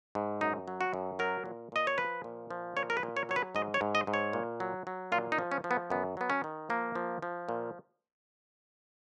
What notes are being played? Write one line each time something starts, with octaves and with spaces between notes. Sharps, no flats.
G#2
F#2 D#4
F#3
F#4
F#2
F#3 A#4
A#2
A#2 D#5
C#5
F3 B4
A#2
F3
A#2 C#5
A#4
B4
A#2
C#5
F#3 C#5
B4
G#2 D#5
C#5
G#2
D#5
G#2
C#5
A#2
F#3
F#3
A#2 F4
D#4
F3
C#4
F3
B3
F#2 B3
F#3 B3
C#4
D#3
F3 A#3
F3
F3
A#2